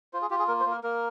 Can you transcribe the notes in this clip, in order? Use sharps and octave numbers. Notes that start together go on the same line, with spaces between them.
F4 C5
G#4
F4 G4
G#4
A#3 A#4
C5
A#3
A#4
A#3 A#4